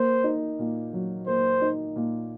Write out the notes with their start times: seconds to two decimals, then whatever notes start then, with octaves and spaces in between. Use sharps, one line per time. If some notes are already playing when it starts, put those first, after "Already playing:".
Already playing: A#3 C5
0.24 D#4
0.59 A#2
0.93 F#3
1.27 A#3 C5
1.61 D#4
1.96 A#2